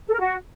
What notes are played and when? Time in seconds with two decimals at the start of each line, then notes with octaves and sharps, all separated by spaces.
0.08 A4
0.14 A#4
0.20 F#4